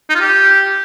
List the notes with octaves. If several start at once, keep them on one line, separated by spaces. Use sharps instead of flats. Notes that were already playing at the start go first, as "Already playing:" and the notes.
D#4
F4
G4